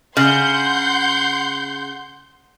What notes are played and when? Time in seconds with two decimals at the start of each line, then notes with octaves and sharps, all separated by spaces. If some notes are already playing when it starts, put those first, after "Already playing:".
0.17 C#3 F#5 C6 G6